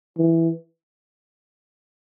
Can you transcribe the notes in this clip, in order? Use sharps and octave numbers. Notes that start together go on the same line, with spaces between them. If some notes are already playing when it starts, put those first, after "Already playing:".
E3